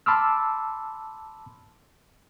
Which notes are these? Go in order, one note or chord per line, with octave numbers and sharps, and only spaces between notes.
A5 B5 C6 D6 E6 F6